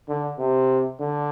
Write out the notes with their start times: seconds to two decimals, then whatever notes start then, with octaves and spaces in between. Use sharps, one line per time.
0.09 D3
0.39 C3
1.00 D3